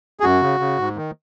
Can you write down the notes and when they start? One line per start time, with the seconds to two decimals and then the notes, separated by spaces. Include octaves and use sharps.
0.20 G#4
0.23 F#2 F#4
0.42 C#3
0.60 C#3
0.78 G#2
0.96 D#3